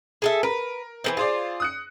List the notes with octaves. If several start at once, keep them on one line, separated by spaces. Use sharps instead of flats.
G#4 A4 E5
A#4 B4
E3 A#3 C4
F4 G#4 C5 D5
D#6 F#6 C#7